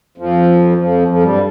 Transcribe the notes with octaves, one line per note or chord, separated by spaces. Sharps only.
F2 F3
F2 F3
F2 F3
G2 G3